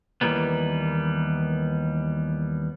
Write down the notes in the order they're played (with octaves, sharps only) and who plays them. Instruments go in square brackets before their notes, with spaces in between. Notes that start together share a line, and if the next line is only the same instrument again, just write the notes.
[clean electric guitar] D#2 C3 E3 G3 A#3 B3